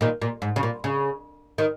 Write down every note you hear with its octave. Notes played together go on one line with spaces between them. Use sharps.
A#2 D#3
A#2
G#2
C#3
A#2
C#3
D#3